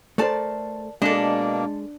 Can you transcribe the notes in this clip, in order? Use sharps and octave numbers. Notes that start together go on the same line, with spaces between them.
A3 A4 A#4 C5 D5 A5
B2 G#3 A#3 D4 A4 D#5